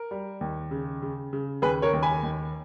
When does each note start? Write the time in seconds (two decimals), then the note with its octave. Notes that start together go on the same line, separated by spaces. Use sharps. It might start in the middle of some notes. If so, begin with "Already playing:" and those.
Already playing: A#4
0.11 G3
0.41 D#2
0.71 C#3
1.02 C#3
1.33 C#3
1.62 D#2 G#4 B4
1.82 A#4 C#5
1.93 D#2
2.03 G#5 B5
2.23 D#2